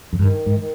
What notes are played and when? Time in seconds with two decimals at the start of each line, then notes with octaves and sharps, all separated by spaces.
0.11 F2 D3
0.19 G2 D#3
0.46 G#2
0.60 D#3